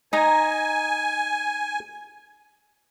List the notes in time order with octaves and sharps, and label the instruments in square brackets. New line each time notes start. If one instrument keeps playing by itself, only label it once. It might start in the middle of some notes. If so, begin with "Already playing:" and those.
[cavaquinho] D#4 A#5 [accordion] G#5